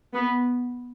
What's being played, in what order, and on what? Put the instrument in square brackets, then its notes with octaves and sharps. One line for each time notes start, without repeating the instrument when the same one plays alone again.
[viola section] B3